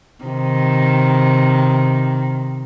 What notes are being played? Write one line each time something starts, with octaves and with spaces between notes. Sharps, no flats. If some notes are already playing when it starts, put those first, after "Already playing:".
C3 D#3